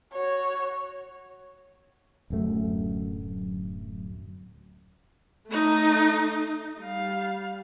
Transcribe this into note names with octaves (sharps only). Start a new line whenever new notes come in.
F#4 C#5
D1 F#2 A3
A3 D#4
G3 F5